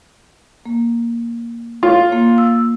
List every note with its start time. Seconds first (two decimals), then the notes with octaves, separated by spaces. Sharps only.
0.66 A#3
1.83 F4 C#5
2.12 A#3
2.38 E6